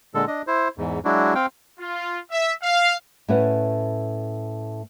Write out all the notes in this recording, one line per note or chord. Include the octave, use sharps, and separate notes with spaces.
A#2 D3 G#3 A4
D4 D#5
E4 C5
E2 G#2
F#3 G#3 D4 E4 F#4
C4 F5 G5
F4
E5
F5
A2 A3 C#4 B4 F#5